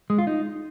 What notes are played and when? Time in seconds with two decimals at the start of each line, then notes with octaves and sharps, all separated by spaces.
0.10 G#3
0.18 F4
0.27 D#4